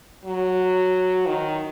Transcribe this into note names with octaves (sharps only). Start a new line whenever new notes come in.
F#3
D#3